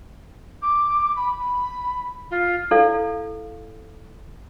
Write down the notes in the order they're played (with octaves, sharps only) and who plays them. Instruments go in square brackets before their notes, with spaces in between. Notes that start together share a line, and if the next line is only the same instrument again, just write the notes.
[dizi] D6
B5
B5
F4
[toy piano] E4 A4 D5 F5